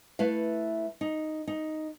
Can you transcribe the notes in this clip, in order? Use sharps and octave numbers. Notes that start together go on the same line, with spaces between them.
A3 E4 B4 F5
D#4
D#4